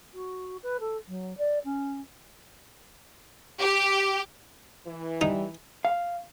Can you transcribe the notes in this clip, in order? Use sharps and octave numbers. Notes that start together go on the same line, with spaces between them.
F#4
B4
A4
F#3
D5
C#4
G4
E3
G3 D#4
F5